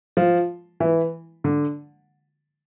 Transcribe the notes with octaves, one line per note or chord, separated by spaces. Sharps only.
F3
E3
D3